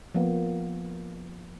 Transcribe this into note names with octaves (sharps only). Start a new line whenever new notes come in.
F3 A#3 B3